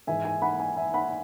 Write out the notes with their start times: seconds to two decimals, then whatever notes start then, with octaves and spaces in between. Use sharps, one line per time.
0.07 G#2 E3 E5 G#5
0.25 E5 G#5
0.42 F#5 B5
0.59 E5 G#5
0.77 E5 G#5
0.94 F#5 B5